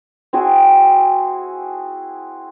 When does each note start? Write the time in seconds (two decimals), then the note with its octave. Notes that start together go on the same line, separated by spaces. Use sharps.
0.33 C4 E4 F#4 G#4